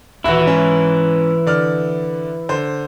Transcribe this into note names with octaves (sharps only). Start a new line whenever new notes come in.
D#1 E3 E4 F#4
G#2 C#4
D3 D5 F6
D3 C5